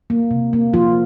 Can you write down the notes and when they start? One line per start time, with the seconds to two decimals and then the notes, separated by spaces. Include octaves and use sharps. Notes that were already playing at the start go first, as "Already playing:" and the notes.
0.10 A#3
0.31 C3
0.53 A#3
0.73 F3 F4